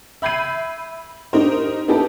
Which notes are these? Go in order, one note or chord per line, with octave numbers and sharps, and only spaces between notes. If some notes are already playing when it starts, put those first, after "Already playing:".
E5 B5 G6 G#6 C7 D#7
D#4 G4 A#4 C5
B3 D#4 E4 G4 A4 B4